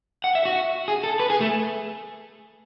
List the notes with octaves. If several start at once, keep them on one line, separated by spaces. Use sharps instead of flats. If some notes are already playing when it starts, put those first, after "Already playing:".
F#5
E5
F#4
G#4
A4
B4
G#4
A3